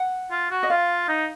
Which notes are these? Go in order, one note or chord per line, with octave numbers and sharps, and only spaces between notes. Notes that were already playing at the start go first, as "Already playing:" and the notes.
Already playing: F#5
F4
F#4
D#5
F4 F5
D#4